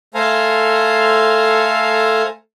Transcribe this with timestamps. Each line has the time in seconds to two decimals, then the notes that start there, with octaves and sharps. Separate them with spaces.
0.14 A3 A4 C5 F5 G#5 A#5